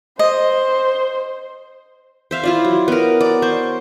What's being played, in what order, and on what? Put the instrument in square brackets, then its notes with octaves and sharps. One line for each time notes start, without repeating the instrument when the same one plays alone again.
[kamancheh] C5 [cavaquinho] D#5
[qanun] C5 E5 F5
E4 F4 D5
F#3
B3 A#4
D5
C5 C#6